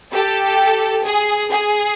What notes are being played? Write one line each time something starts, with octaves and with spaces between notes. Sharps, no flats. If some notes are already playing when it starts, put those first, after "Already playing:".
G4 A4
G#4
G#4